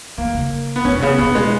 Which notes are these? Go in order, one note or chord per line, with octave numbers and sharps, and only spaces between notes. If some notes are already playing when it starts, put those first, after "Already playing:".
D#3 A#3
C#3
B3
D#3 C#4
B2
C#3 B3
B2 B3
G#3